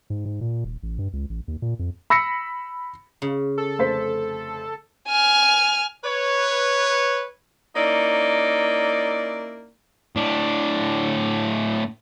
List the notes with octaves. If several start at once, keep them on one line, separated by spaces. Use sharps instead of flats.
G#2
G#2
A#2
D#1
A1
G2
C#2
A1
D#2
A#2
F2
B5 E6 A#6 B6 C#7
C#3
A4
F1 C5 B6
G#5 F6
B4 C#5
A#3 C#4 D#4 E4 D5
A2 D4